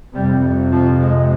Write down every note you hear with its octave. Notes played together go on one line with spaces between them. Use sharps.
F2 C3 G3
F3
G#3